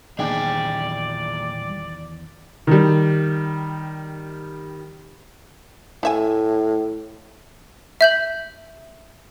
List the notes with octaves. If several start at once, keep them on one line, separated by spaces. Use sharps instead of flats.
E2 A#2 D#3 G3 D4 G#4 D5 G5
D#3 G3
A2 A3 E5 G#5
E5 G6 F#7